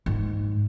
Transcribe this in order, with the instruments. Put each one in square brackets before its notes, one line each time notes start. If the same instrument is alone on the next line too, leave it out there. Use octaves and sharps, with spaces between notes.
[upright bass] G#2